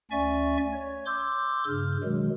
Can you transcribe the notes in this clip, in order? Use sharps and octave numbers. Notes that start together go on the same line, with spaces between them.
D2 C#4 D5 E5 G#5 C#6
C#5
C6 D6 E6 G6
G2 C#3 F6
B2 D#3 F#3 G#3